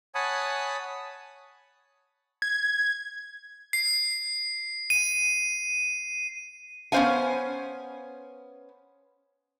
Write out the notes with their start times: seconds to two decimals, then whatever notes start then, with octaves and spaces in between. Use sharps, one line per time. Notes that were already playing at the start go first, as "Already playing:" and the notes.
0.15 C#5 F#5 G#5 A5 B5 D#6
2.42 G#6
3.73 C7
4.90 D#7
6.92 B3 C#4 C5 F5 G#5